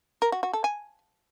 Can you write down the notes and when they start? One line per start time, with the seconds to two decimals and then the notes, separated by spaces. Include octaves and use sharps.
0.22 A#4
0.32 F#4
0.43 F#4
0.53 A4
0.64 G#5